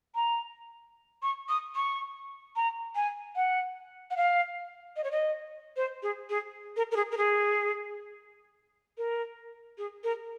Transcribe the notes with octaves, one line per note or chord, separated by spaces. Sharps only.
A#5
C#6
D#6
C#6
A#5
G#5
F#5
F#5
F5
D#5
C#5
D#5
C5
G#4
G#4
A#4
A#4
G#4
A#4
G#4
A#4
G#4
A#4